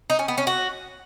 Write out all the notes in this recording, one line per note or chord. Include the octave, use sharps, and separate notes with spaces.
D#4
C#4
B3
C#4
F#4